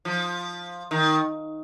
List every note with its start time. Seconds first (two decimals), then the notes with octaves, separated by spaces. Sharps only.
0.05 F3
0.91 D#3